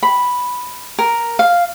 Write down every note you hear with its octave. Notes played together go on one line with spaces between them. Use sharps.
B5
A#4
F5